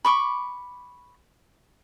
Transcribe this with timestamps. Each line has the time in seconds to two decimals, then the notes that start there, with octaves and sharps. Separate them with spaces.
0.05 B5 C#6 D6